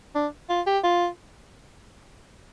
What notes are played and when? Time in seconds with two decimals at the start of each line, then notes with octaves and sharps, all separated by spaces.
0.15 D4
0.49 F4
0.66 G4
0.84 F4